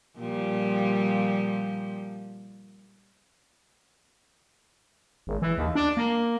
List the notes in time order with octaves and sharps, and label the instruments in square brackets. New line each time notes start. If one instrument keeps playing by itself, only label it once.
[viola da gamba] A#2 F3 G3
[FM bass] G#1
E3
D#2
D4
A#3